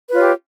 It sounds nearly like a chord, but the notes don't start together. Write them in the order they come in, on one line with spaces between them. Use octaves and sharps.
B4 F4 C#5 G4